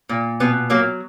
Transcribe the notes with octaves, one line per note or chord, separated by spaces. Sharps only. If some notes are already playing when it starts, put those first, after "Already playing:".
A#2
B2 B3
F#3 A#3